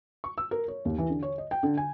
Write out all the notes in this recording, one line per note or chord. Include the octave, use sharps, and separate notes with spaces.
C#6
E6
A#4
C#5
D#2
E3
D3
C#5
D#5
G5
D3
G#5